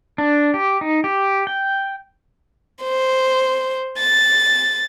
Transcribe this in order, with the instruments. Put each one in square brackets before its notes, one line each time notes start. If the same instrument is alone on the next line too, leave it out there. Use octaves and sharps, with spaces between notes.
[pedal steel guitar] D4
G4
D#4
G4
G5
[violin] C5
A6